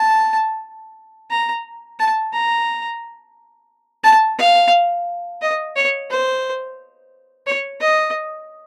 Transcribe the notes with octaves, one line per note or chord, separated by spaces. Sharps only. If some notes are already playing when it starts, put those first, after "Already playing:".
Already playing: A5
A#5
A5
A#5
A5
F5
D#5
C#5
C5
C#5
D#5